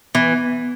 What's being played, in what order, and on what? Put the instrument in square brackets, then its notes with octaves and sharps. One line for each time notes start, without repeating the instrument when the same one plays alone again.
[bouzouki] E3 [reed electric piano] B3